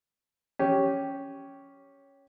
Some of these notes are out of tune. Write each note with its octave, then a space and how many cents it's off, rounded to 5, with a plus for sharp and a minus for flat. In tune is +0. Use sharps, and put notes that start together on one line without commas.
C#4 +0 G4 -5